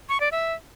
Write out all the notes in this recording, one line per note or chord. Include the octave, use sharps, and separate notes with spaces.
C#6
D5
E5